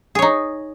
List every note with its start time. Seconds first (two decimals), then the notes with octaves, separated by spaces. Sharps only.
0.15 G#4
0.19 C#5
0.22 D#4